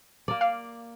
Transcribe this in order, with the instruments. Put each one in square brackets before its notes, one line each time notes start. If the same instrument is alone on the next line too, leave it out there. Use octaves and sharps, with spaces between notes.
[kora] A#3 D5
[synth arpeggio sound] F5